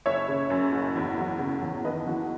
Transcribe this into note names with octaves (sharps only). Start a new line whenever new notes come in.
F#1 C#5 E5
C#3
F#2
F#1
E2
F#3
C#3
E2
D#2 B4 D#5
E3 F#4